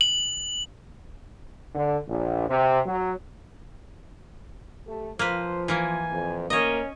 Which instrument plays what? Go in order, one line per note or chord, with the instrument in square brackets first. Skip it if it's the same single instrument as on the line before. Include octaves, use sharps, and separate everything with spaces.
[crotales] F#7
[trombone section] D3
A#1
C3
F#3
[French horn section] A3 G4 A4
[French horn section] F3 [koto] A#3 B4 [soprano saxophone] C5
[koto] E3 A#3 [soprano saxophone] G#5
[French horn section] F2
[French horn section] D2 A#3 [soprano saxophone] C#4 [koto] C#5 D#5